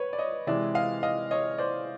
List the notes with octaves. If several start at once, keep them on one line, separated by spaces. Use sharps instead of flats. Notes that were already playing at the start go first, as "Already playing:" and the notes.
Already playing: B4 C#5
D5
C#5 D#5
C3 E3 G#3 D5 E5
D#5 F5
D#5 F5
C#5 D#5
C5 D5